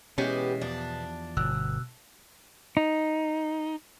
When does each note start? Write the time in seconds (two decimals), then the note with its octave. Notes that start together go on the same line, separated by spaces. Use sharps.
0.18 B2 E3 G#3 B3 C#4 G4
0.61 E2 F3 D4
1.37 G1 B2 E6 F#6
2.77 D#4